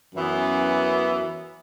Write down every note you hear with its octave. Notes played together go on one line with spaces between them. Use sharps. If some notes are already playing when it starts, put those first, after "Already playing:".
F#2 E3 B3